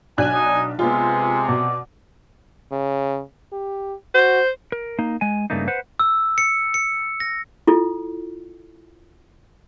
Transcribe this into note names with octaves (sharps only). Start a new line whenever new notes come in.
B1 D4 G#5 F#6
D#4
C3 G#3 B3 F4
B2 D5
C#3
G4
F#4 C5
A#4
A#3 D#4
G#3 G#5
G2 C#3 A3 A#3 D#4
B4 C5 F#5
E6
C#7
C#7
A#6
E4 F4 A4